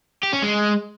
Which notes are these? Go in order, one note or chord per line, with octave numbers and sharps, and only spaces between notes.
G4
C#4
G#3